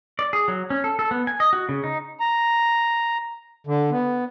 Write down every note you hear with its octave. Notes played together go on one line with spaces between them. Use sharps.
D5
G#4
F#3
C#4
A4
A4
B3
G#5
D#5
F#4
C#3
D#4
A#5
D3
B3